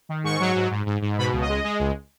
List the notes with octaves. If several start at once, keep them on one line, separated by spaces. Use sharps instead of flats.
D#3
G#2 C#6
F#3
G#2
G#2
G#2
G#2
B2 B5
C#2
D#5
G#3
G#3
C#2